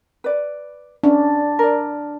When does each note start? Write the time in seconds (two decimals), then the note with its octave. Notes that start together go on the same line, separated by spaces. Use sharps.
0.24 B4 D5
1.03 C#4 D4
1.59 A#4 D5